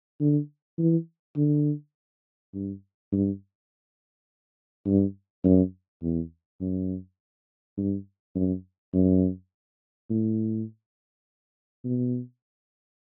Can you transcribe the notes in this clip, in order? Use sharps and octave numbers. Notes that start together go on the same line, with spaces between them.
D3
E3
D3
G2
G2
G2
F#2
E2
F#2
G2
F#2
F#2
A2
B2